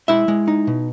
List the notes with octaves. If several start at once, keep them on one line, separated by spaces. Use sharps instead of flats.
G#3 E4 E5
G#3
D#4
B2